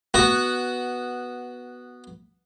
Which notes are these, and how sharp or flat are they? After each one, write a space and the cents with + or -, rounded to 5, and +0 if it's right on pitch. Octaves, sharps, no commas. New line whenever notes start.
B3 -5 F#4 +5